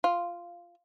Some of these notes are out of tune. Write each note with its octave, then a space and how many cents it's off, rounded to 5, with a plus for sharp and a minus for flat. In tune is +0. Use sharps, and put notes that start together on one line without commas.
F4 -5